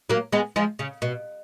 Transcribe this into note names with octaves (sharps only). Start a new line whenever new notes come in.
F#3 A#3
G#3 B3
F3 G#3
C#3
B2